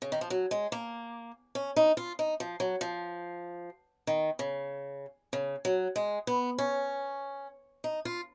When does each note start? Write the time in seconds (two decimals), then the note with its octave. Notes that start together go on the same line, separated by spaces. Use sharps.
0.02 C#3
0.12 D#3
0.21 F3
0.30 F#3
0.51 G#3
0.72 A#3
1.55 C#4
1.76 D#4
1.97 F4
2.19 D#4
2.40 F3
2.60 F#3
2.81 F3
4.07 D#3
4.39 C#3
5.33 C#3
5.65 F#3
5.96 G#3
6.27 B3
6.58 C#4
7.84 D#4
8.05 F4